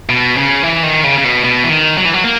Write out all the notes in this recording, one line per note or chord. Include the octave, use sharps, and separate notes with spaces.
B2
C#3
E3
D#3
C#3
C#3
B2
B2
E3
D#3
F#3
E3
F#3
A#3